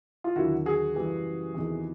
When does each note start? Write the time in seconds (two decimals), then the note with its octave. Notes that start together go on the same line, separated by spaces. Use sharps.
0.24 F4
0.36 D#2 D3 F#3 E4 F#4
0.66 F#4 G#4
0.95 F#2 C#3 E3 G3
1.54 E2 C3 D#3